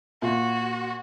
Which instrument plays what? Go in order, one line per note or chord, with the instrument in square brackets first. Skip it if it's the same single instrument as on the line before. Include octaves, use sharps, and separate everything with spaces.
[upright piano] A#2 F4 [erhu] F#4